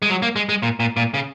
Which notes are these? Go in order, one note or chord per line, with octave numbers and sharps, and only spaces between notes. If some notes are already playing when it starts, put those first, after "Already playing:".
G#3
F#3
A#3
G#3
G#3
A#2
A#2
A#2
C#3